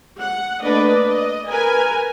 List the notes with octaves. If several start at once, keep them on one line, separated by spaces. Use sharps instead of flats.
F#5
A3 A#3 D4 B4 D5 D#5
D#5
A#4 B4 G#5